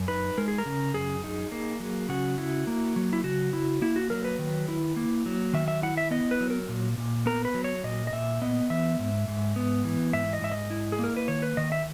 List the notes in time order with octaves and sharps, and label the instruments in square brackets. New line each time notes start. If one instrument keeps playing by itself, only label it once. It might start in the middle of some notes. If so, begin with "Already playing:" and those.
Already playing: [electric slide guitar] F#2
D#4 B4
G#3 A#4
G#4
A#4
C#3
F#2 G#4
D#4
A#3
F#3
C#3 F#4
E4
A#3
F#3
E4
C#3 F#4
E4
A#3 E4
F#4
F#3 A#4
B4
D#3
E4
A#3
F#3
D#3 E5
E5
E4 F#5
E5
B3 D#5
B4
F#3
A#4
A#2
A#2
B3 A#4
B4
F#3
C#5
A#2 D#5
D#5
A#2 E5
B3 D#5
E3 E5
G#2
G#2
B3
E3
G#2 E5
D#5
G#2 E5
D#5
E4
G#4
A#3 A#4
B4
D#3 C#5
B4
D#3 D#5
E5